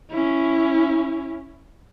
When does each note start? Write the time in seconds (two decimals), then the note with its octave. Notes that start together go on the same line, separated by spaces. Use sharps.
0.10 C#4 E4